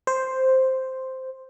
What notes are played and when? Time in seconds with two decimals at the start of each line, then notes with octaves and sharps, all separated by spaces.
0.07 C5